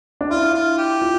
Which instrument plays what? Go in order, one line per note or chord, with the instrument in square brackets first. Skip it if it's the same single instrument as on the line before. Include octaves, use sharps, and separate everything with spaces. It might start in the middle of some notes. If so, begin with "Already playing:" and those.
[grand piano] D4
[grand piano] E4 [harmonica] F4
[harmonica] F4
G4
[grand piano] F4